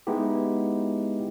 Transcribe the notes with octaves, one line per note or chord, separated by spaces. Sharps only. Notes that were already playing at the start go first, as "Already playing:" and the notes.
G#3 B3 D#4 E4 G4